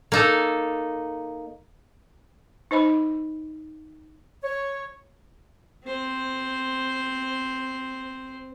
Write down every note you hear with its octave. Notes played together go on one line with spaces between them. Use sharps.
A#3 D#4 A4
D#4 C5 D#5 B5
C#5
C4 C5